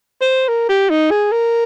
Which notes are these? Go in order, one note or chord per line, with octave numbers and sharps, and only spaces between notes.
C5
A#4
G4
D#4
G#4
A#4